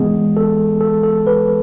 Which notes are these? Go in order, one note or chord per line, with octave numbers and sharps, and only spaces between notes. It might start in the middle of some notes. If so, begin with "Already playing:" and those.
Already playing: E3 G#3 B3 G#4
A4
A4
A4
B4